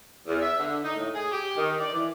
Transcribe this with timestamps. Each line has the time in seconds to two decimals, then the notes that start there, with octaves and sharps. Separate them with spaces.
0.27 E2
0.41 E5
0.57 D3
0.82 D#4
0.96 A2
1.13 G#4
1.30 G4
1.56 D#3
1.79 D5
1.93 E3